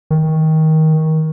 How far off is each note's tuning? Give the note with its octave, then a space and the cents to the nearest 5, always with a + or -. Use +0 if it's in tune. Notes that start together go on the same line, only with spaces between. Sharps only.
D#3 +20